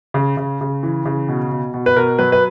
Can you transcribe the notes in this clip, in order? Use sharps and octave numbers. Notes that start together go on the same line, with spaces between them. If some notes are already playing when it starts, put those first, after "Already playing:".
C#3
C#3
C#3
E3
C#3
B2
B2
B2
B4
B2 A#4
F#3 B4
B4